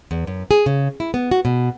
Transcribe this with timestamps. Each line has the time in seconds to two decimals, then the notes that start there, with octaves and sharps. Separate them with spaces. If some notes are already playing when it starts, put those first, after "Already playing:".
0.11 E2
0.27 F#2
0.51 G#4
0.66 C#3
1.00 E4
1.14 B3
1.31 F#4
1.45 B2